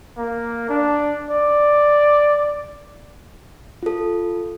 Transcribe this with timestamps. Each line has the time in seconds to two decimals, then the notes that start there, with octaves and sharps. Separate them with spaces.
0.17 A#3
0.69 D4
1.30 D5
3.83 F4 A4